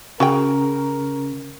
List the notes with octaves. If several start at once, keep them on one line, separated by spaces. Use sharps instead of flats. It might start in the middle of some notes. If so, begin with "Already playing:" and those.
C#3 F#4 G#4 A#4 G5